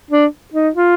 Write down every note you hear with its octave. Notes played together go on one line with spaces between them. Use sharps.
D4
D#4
F4